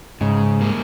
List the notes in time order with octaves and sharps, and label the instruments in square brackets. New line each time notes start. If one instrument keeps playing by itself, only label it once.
[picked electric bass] G#2 [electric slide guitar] C#3
[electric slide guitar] G3 A#3